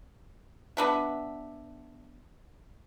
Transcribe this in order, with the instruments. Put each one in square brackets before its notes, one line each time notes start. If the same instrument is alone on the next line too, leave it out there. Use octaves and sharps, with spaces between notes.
[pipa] B3 D4 E5